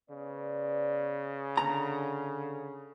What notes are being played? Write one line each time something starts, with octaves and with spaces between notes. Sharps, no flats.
C#3 B3 C5 D5
D3 A#5